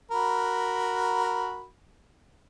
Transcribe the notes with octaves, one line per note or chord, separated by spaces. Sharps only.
F#4 A#4 B5